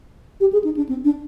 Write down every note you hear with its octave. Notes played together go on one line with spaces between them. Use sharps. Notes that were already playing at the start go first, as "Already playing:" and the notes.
G4
G#4
D#4
D4
C4
D4